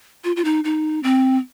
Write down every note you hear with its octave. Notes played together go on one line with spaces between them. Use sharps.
F4
F4
D#4
D#4
C4